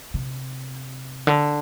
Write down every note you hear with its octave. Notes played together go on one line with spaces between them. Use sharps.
C3
D3